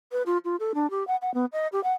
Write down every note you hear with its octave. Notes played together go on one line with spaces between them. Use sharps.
B4
F4
F4
A4
D4
G4
F#5
F#5
B3
D#5
G4
F#5